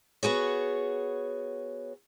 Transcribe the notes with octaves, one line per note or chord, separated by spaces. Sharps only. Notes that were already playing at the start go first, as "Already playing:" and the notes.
B3 F#4 G#4 C#5